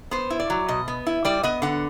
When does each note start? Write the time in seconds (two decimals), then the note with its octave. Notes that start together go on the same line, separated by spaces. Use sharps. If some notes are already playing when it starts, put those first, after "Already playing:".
0.11 B3 C5
0.30 E4
0.40 D5
0.50 F#3
0.68 B2 D#5
0.88 B3
1.07 E4
1.25 G3 D5
1.43 B3 D#5
1.62 D3 F#5